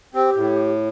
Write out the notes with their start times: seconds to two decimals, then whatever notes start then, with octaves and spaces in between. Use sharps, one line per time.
0.15 C4 G4
0.36 A2